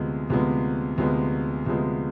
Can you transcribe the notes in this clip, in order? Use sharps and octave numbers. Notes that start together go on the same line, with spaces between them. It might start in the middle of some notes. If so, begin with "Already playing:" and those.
Already playing: D2 C3 F3 G#3 B3
D2 C3 F3 G#3 B3
D2 C3 F3 G#3 B3
D2 C3 F3 G#3 B3